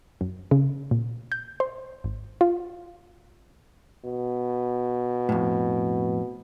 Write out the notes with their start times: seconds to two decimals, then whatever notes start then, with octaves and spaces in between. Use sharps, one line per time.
0.21 F#2
0.51 C#3
0.91 A#2
1.32 G6
1.60 C5
2.04 G#1
2.41 F4
4.05 B2
5.29 F2 A2